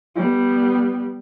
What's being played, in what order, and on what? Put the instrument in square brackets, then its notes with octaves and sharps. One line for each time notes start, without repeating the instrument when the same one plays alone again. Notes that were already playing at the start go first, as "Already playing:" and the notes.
[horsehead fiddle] G3 B3